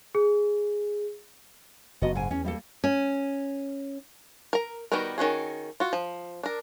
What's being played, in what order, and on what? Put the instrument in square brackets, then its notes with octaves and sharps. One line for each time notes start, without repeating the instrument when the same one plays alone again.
[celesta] G#4
[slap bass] F#1 [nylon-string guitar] B3 F#4 D#5
[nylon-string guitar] G#2 G#5
[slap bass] E2 [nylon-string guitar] C#4
[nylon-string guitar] G3 A#3 A4
C#4
[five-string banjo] A#4 A#5
D#3 G3 B3 F#4 A#4
D#3 C#4 F#4 G#4
F4 F#4
F3
D4 A#4